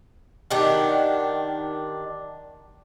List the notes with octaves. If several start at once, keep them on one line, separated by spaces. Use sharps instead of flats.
D#3 D4 G4 F#5